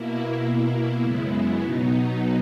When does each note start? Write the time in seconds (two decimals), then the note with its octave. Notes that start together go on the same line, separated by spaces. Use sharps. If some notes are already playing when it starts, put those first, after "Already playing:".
Already playing: B2 A#3 E4
0.44 B2 A#3 E4
1.02 F#2 C#3 G#3 B3 E4
1.61 B2 F#3 B3 D#4